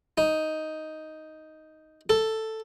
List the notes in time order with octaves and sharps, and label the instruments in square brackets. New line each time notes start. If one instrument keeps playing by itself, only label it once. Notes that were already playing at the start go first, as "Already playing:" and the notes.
[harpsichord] D#4
A4